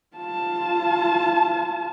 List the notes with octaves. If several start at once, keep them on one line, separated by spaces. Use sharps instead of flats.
F4 A5